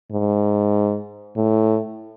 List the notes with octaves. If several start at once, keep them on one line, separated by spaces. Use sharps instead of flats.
G#2
A2